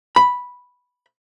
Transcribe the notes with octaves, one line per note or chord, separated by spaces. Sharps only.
B5